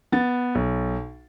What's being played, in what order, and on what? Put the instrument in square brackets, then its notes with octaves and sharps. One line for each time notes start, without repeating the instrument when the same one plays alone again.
[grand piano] B3 A6
B1